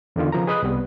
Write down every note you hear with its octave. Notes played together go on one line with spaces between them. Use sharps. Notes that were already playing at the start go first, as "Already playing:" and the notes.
E2 D3 D#3 F4
C#3 F3 A#4 A#5
G#4 B4 D#5 B5 D#6 F#6
C2 G3 B3